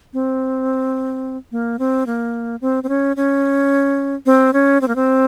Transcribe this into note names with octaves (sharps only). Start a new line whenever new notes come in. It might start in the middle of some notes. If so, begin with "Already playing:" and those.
C4
A#3
C4
A#3
C4
C4
C#4
C#4
C4
C#4
C4
A#3
C4